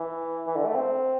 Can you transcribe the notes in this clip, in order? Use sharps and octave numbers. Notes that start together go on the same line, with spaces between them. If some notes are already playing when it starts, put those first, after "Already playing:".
Already playing: E3
E3
D3
A3
C4